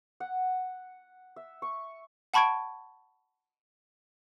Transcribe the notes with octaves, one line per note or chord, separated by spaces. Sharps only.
F#5
E5
C#6
F#5 A5 B5 C#6 G#6 D7